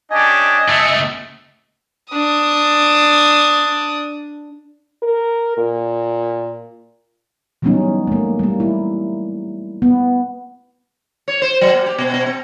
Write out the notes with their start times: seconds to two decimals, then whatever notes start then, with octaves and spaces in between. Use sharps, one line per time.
0.11 C#4 D4 G4 D#5 G#5
0.69 C#2 A3 E5
2.12 D4 D#6
5.03 A#4
5.58 A#2
7.62 E3 F#3 G3 B3 C#4 D#4
8.07 A3 A#3
8.39 G3 A#3
8.60 E4
9.82 B3
11.28 C#5
11.42 C5
11.61 F#3
11.74 A#3
11.86 G4
11.98 B2
12.14 B2
12.26 C4